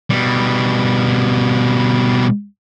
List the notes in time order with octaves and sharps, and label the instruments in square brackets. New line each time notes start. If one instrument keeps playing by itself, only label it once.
[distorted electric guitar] B2 G3